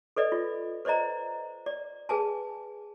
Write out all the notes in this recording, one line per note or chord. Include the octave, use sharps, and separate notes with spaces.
A4 B4 D5 D#5
F4
B4 C5 D5 D#5 A#5
D5
G#4 B4 G#5 A5